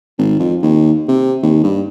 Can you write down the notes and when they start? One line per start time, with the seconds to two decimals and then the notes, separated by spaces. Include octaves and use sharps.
0.18 G#1
0.39 F2
0.62 D#2
1.08 C3
1.43 D#2
1.64 G2